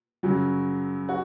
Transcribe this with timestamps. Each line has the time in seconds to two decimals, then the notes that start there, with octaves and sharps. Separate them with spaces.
0.23 F#2 C#3 F#3
1.09 F#4